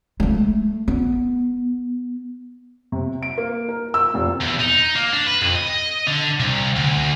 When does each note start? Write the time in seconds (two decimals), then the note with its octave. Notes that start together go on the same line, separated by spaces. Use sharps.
0.20 G#3 A3
0.88 B3
2.92 C3
3.23 D7
3.38 A#3
3.69 A#4
3.94 E6
4.14 F1
4.41 E2
4.60 D#4
4.95 A#3
5.13 D4
5.27 B4
5.41 F2
5.55 D#5
6.06 D3
6.40 C2
6.76 D2